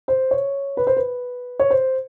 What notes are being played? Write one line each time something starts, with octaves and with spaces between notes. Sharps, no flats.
C5
C#5
B4
C5
B4
C#5
C5